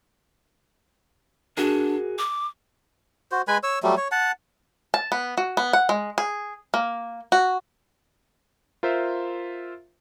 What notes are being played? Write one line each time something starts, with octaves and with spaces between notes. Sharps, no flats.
D4 F#4 G#4 A#4
D6
F#4 C5
G#3 B4 G#5 B5
C#5 E6
F#3 G3 A3
C#5
F#5 A5
A5
B3
F#4
B3
F#5
G#3
G#4
A#3
F#4
F4 A#4 C5 E5